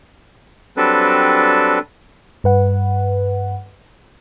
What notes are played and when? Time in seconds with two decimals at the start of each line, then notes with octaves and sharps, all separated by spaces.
0.77 F#3 G3 C4 D4 A4 B4
2.44 G2 B4 F#5